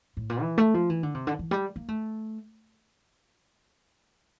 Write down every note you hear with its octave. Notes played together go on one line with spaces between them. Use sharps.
A2
A#2
E3
A3
F3
E3
D3
C3
D3
E3
G3
A#3
A3